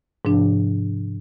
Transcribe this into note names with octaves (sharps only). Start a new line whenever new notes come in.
G#2 C3 F3 D4